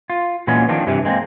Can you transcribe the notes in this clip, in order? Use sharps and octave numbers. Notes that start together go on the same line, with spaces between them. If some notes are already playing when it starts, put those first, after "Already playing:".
F4
A#2 E3 G#3 B3 C#4
D#3 F3 C4 D4
G2 C3 E3
G#3 A#3 C4